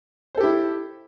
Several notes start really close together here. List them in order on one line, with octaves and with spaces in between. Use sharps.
C5 A4 G4 E4